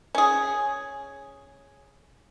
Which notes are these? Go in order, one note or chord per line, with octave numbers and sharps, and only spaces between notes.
C#4 G#4